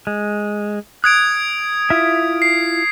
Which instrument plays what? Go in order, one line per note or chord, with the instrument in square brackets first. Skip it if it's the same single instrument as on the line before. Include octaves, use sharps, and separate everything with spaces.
[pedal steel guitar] G#3
[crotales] D#6 G#6 D7 [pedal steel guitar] F#6
[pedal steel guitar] E4 F4 E5
[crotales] C7